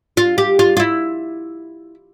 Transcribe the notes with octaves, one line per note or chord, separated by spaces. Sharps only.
F4
G4
F4
F4
E4